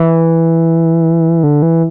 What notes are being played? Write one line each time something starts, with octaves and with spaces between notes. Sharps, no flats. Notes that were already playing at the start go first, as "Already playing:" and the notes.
Already playing: E3
D3
E3